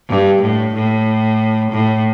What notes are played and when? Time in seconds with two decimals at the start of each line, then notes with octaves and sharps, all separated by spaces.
0.09 G2
0.42 A2
0.74 A2
1.71 A2